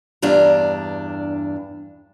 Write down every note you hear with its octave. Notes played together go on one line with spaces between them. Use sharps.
E2 G2 D4 G4 A#5